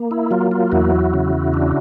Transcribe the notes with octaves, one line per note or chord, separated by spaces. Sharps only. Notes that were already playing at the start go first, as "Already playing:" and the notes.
Already playing: A#3
E4
F#3 F4
F4
E2 E4 F#4
C#3
D4